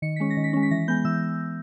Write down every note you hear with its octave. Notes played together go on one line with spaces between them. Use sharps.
D#3 C#7
G#3 C#4 B6
A#6
D#3
B6
G#3 C#4
B6
E3 A#6
G#3 B3 G6
E3 E6